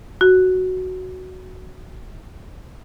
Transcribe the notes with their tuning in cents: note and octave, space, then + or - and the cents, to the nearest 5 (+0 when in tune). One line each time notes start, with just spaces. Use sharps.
F#4 +0